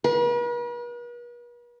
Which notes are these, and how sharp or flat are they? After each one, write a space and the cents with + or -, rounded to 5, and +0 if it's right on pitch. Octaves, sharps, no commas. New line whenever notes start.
B4 -45